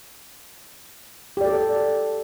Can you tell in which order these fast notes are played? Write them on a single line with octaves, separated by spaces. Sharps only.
G4 D5 A4